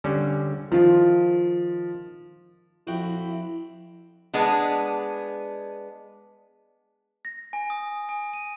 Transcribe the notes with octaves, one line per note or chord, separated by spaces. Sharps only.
D3 G3 C#4
D#3 F3 F4
F2 E4 F#4 G5
G#3 B3 D4
A#6
G#5
D#6
G#5
D#7